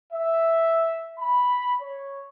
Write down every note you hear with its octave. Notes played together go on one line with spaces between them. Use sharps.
E5
B5
C#5